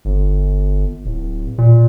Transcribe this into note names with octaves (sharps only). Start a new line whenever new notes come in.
G1
D1
A#2